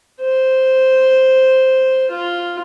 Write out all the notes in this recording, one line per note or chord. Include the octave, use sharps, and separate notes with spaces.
C5
F4